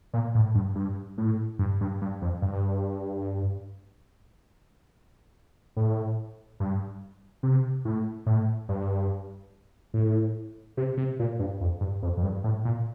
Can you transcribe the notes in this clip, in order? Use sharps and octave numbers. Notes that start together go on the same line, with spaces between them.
A#2
A2
G2
G2
A2
G2
G2
G2
F2
G2
A2
G2
C3
A2
A2
G2
A2
C3
C3
A#2
G2
F2
G2
F2
F2
G2
A2
A#2